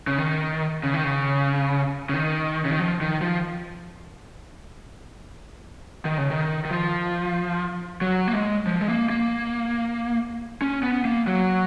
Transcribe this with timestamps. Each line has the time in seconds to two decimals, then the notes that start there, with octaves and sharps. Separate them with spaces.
0.07 C#3
0.18 D#3
0.83 C#3
0.94 D#3
1.04 C#3
2.09 C#3
2.14 D#3
2.65 C#3
2.72 D#3
2.79 F3
3.01 D#3
3.22 F3
6.05 D#3
6.18 C#3
6.31 D#3
6.65 D#3
6.71 F3
8.01 F#3
8.28 A#3
8.33 G#3
8.67 F3
8.81 G#3
8.88 A#3
9.10 A#3
10.62 C#4
10.83 B3
11.05 A#3
11.27 F#3